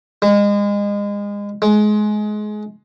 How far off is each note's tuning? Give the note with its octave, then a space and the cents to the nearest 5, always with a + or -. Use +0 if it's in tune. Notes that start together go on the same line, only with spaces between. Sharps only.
G#3 -30
G#3 +25